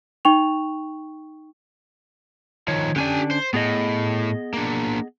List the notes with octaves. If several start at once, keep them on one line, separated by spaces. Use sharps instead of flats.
D#4 G5 C#6 F7
D#3 F3 C#5
D3 C#4 D4 G4 G#5
C5
A2 B3 G#4 D#5
A#3 D4